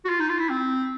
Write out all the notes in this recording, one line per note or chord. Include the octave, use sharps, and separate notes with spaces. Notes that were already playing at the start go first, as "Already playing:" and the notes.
F#4
F4
D#4
F4
E4
C4